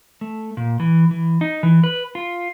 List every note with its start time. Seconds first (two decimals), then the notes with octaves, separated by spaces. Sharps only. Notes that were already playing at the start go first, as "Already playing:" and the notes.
0.21 A3
0.57 A#2
0.80 E3
1.11 E3
1.41 D#4
1.63 E3
1.84 B4
2.15 F4